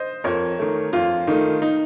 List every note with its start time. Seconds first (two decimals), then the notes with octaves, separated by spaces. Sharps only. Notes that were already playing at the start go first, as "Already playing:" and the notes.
Already playing: C5 D#5
0.24 F2 A#4 C#5
0.59 D#3 A3
0.93 F2 F4
1.27 D#3 A3 D#4
1.62 D#4